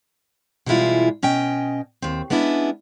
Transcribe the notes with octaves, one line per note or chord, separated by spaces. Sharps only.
B2 E3 G3 G#3 E4 F4
B2 C#4 D#5 G5
D#2 C4
G#3 B3 C#4 D4 E4